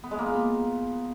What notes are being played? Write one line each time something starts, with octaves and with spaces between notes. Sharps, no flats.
B3
G#3
A#3
F4
B3